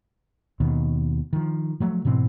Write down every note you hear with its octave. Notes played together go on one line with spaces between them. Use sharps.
D#2 B2 D#3
D#3 F3
F3 F#3 A3
G#2 B2 E3 C4